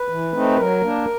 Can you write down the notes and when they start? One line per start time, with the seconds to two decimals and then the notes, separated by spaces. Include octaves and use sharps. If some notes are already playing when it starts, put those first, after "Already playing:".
Already playing: B4
0.09 E3
0.33 A3 C4 D#4
0.57 F#3 A#4
0.81 A#3 D4